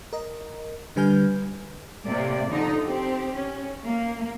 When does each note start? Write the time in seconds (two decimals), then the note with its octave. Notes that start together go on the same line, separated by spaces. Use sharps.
0.13 A#4 D#5
0.96 D3 G3 B4 G#5 F6 G6
2.05 A2 C3 A#3 D5
2.50 D3 F3 D#4
2.82 C4 G4
3.35 C#4
3.83 A#3